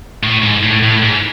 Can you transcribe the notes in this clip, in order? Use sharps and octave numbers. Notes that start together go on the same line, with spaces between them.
A2
G#2
A2
A2
G#2